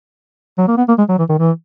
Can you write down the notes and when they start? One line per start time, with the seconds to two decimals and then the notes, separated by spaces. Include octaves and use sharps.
0.58 F#3
0.68 A#3
0.78 B3
0.89 A#3
0.98 G#3
1.09 F#3
1.19 E3
1.29 D#3
1.39 E3